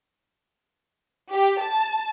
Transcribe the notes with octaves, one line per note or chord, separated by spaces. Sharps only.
G4
A5